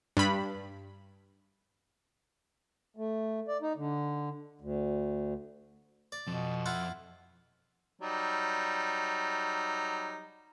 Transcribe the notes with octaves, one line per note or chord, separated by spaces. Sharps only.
G2 B5
A3
D5
D#4
D3
D2
D5
F2 B2
E4 F4 F#5
F#3 G3 D#4